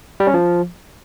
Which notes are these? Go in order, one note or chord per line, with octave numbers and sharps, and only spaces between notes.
G3
C#4
F3